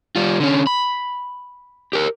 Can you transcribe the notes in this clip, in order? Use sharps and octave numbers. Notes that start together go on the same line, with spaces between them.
G3 F4
D3 C#4
B5
G4 A#4